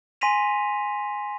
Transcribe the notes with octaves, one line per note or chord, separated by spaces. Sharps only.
G#5 C6 A#6 B6 D#7 F7